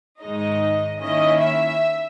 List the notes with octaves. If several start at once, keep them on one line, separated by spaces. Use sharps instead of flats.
G#2 D#3 G#3 D#4 D#5
D#3 A#3 C#4 E4 D#5
E5